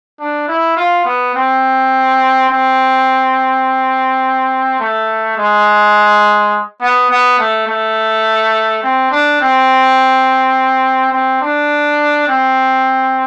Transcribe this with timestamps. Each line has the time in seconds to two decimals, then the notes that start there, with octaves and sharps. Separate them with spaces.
0.20 D4
0.48 E4
0.77 F4
1.05 B3
1.35 C4
2.50 C4
4.80 A3
5.38 G#3
6.81 B3
7.11 B3
7.39 A3
7.67 A3
8.83 C4
9.11 D4
9.41 C4
11.13 C4
11.41 D4
12.28 C4